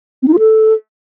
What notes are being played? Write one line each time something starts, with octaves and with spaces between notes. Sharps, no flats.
C4
D#4
F4
A4